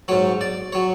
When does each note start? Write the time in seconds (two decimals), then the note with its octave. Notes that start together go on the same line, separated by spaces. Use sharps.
0.08 G#2 F#3 C#5
0.41 D5
0.73 F#3 C#5